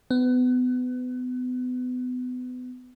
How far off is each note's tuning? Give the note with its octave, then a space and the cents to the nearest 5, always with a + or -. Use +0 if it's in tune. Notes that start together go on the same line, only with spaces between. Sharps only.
B3 +30